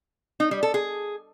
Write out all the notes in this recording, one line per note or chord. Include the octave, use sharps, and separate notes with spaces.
D#4
G3
A4
G#4